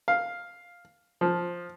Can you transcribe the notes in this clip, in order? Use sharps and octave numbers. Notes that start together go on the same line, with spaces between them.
F5
F3